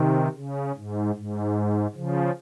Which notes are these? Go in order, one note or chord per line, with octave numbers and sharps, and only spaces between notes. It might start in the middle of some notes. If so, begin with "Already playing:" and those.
Already playing: C3 D#3
C#3
G#2
G#2
C#3 F3